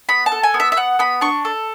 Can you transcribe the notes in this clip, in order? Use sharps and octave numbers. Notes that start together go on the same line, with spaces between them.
B3 B5
A5
A4
G#5
B3
E5
E5
B3 F#5
B3 B5
D4 C#6
A4